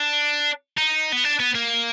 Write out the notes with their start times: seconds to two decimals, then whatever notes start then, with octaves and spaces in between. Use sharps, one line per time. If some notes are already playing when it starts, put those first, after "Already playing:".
Already playing: D4
0.77 D#4
1.12 B3
1.24 D4
1.40 B3
1.55 A#3